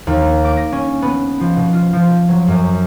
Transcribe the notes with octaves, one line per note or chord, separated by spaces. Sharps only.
D#2
A#3
D6
A#6
C#4
B3
F3
B2
F4
F3
F#3
F#2